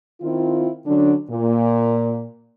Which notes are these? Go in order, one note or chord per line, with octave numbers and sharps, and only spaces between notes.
D#3 C4 E4 F4
D3 F#3 C#4 D4
A#2